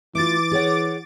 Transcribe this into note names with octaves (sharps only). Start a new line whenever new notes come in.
E3 A3 F4 D6 A6
G#4 C#5 F#5